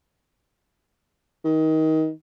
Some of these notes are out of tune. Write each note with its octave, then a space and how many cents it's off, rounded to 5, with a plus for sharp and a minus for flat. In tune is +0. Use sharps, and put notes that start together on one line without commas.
D#3 +25